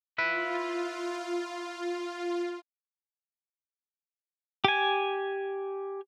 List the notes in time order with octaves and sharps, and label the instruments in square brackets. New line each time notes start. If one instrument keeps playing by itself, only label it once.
[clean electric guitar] E4 B4 [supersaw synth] F4
[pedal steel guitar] G4 G#5